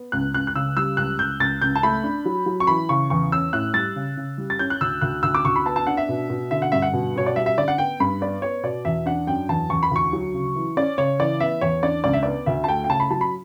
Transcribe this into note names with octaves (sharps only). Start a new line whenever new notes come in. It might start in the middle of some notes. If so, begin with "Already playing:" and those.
Already playing: B3
C#2 F#6
C#2 F#6
F#6
C#3 E6
G3 E6
C#2 F#6
C#2 G6
C#2 A6
C#2 G6
A5
A3 B5
D4
F#3
F#3
C#6
E3 B5
C#3 C#6
E2 C#6
C#4 E6
A2 F#6
G3 A6
C#3
C#3
G3
A6
C#4 G6
F#6
D2 E6
D2 F#6
D2 E6
D6
D2 C#6
B5
B3 A5
A5
D4 F#5
E5
B2
B2
D3 E5
F#5
G2 E5
F#5
B2
B2 C#5
D5
G3 E5
E5
D3 D5
F#5
B3 G5
G2 B5
B3 D5
B3 C#5
B2 D5
E2 E5
D4 F#5
F#2 G5
E2 A5
E2 C#6
B5
D2 C#6
F#3
C#3
E3
C#4 D5
C#3 C#5
E3 D5
B3 E5
E2 C#5
D4 D5
C#2 D5
E5
B3 D5
D2 E5
A5
A3 G5
G5
C#3 A5
B5
F#3 A5
B5